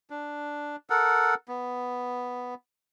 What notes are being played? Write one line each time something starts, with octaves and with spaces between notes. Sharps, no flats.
D4
A4 A#4 F#5
B3